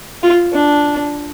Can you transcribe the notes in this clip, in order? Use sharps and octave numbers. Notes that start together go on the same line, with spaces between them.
F4
D4